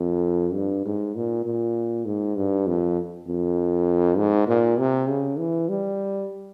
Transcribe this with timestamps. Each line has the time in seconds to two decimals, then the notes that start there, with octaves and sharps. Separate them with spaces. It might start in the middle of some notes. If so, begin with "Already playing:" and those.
Already playing: F2
0.54 G2
0.85 G#2
1.15 A#2
1.45 A#2
2.05 G#2
2.36 G2
2.67 F2
3.27 F2
4.18 G#2
4.47 A#2
4.79 C3
5.09 C#3
5.38 E3
5.69 G3